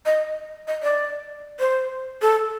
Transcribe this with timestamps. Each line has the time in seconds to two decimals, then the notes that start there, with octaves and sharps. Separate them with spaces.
0.06 D#5
0.67 D#5
0.83 D5
1.60 C5
2.22 A4